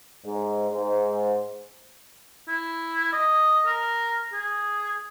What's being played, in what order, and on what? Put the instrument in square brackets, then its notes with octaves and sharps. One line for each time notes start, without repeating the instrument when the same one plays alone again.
[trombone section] G#2
G#2
[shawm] E4
D#5
A#4
G#4